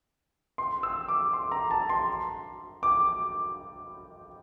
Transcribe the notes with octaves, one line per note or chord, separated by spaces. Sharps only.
C6
E6
D6
C6
A#5
A5
C6
D6